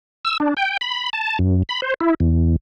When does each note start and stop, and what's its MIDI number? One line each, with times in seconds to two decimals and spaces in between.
0.25 0.37 88
0.40 0.54 62
0.57 0.77 79
0.81 1.10 83
1.13 1.38 81
1.39 1.63 42
1.69 1.80 83
1.82 1.94 72
2.00 2.14 64
2.20 2.56 40